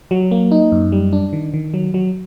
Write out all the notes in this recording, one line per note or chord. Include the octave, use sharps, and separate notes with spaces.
F#3
A#3
D#4
F#2
G3
D4
D#3
D#3
F#3
F#3